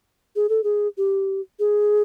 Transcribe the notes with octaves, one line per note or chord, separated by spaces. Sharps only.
G#4
A4
G#4
G4
G#4